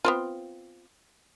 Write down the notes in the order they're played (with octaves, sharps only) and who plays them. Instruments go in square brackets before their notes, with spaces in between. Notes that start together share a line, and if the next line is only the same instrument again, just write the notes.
[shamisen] B3 C4 F4